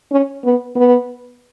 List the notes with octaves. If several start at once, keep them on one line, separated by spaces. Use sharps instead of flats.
C#4
B3
B3